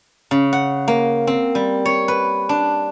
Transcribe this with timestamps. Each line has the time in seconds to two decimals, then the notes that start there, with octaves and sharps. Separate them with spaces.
0.31 C#3
0.53 F#5
0.88 A#3
1.27 C4
1.55 G3
1.85 C#5
2.08 B4
2.49 D4